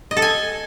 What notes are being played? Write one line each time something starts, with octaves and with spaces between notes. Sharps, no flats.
D#5
A4
G#5